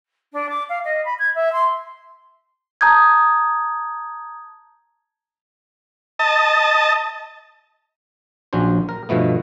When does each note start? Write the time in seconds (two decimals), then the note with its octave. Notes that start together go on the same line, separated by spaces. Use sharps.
0.33 D4
0.49 D6
0.69 F5
0.84 D#5
1.05 B5
1.19 G#6
1.35 E5
1.52 C6
2.81 A5 A#5 D#6 G6 G#6
6.19 D#5 A5
8.53 A#1 F#3 C#4 D4 C5
8.89 A#4
9.09 G2 B2 F3 A3 B3